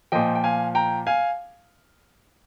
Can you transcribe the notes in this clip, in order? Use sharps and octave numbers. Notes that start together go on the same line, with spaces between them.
A#2 F3 D#5 G5
G5
F5 G#5
G5 A#5
F5 G#5